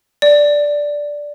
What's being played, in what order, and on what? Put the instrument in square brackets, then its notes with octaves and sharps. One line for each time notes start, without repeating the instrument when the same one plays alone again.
[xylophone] D5